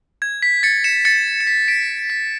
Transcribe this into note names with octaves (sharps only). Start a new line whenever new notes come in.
G#6
B6
A6 C#7
C#7 E7
A6 C#7
C#7
B6
B6 D7
B6